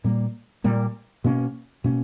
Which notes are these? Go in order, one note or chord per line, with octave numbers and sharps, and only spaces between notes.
A#2 G3 A#3
A#2 G3 A#3
B2 A#3 C#4
B2 A#3 C#4